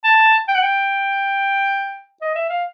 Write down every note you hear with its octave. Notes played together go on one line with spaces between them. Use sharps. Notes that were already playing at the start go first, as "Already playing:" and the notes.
A5
G5
F#5
G5
D#5
E5
F5